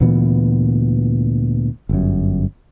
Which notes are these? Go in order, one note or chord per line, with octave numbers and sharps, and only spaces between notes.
D2 A#2 E3 B3
G1 F#2